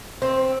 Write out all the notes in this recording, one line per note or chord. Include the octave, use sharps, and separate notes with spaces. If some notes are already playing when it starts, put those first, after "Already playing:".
C4